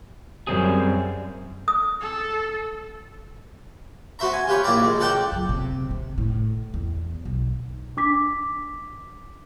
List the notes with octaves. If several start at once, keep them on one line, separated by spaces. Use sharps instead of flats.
F#2 G3 C4 G#4
D#6
A4
B3 F#4 C5 E5 A#5
G#5
F4 G4 B4 C#5
A#1 A#3 E4 D5 A#5
G#3
C#2 A4 D5 F#5 G5 A5
F#2
C3
C3
A2
E2
B1
D4 D6 B6